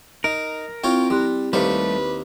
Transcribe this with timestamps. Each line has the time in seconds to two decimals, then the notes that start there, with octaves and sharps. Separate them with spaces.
0.24 D#4 A#4
0.84 C4 E4 F4 C#5 G5
1.10 G3 E4 C6 F#6
1.53 D#2 G3 A3 A#3 B4 C5